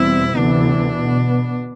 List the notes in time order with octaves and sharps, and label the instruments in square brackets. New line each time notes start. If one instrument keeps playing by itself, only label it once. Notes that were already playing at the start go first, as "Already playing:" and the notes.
Already playing: [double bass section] E2 B2 G3 C4 [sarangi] E4
[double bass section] D2 C3 E3 B3 [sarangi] D4
[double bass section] B2 B3